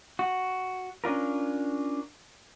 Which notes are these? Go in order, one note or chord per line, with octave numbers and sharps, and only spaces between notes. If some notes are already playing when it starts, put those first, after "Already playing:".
F#4
C#4 D4 F4 A#4